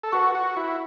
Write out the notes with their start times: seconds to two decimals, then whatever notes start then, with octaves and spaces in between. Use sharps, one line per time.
0.03 A4
0.12 F#4 B4 F#5 C#6
0.35 F#4
0.57 E4